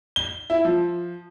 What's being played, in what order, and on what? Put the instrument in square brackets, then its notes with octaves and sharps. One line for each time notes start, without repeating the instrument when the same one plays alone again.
[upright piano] G7
E4
F3